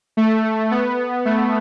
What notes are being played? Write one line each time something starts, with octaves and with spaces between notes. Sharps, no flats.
A3
B3
A3